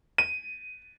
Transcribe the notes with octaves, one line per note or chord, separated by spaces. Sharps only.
D#7